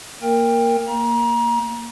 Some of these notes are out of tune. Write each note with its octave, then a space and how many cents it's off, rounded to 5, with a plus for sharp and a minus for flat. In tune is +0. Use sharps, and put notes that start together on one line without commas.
A#3 +0 A#4 +0 G5 +25
A#3 +0 A#5 +30